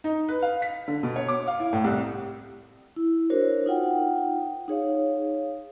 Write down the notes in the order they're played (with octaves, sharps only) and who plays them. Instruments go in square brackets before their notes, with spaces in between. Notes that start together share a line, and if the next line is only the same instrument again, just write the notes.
[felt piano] D#4
B4
F5
B6
D3
B2
C#5
D6
F5
E4
A2
C2
[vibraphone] E4
D4 F#4 A#4 C5 C#5
D#4 F4 F#5 G5
D#4 G#4 C#5 F5